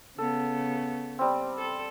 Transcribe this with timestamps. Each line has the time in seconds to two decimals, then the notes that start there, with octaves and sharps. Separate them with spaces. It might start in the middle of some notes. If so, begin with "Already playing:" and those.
0.18 C#3 B3 A4
1.19 G3 C4
1.58 A4